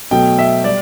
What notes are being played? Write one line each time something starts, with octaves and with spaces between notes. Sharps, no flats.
B2 F#3 A3 G5
E5
G3 D5